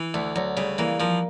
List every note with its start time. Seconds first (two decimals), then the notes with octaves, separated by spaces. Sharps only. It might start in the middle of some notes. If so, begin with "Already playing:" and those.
Already playing: E3
0.14 D2 A3
0.36 D2 F#3
0.57 C#3 G3
0.78 E3 A#3
1.00 F3 A#3